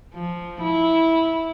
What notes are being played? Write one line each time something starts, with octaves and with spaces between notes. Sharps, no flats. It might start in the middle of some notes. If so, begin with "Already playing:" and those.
F3
E4